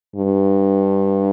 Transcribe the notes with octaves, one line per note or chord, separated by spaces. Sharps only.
G2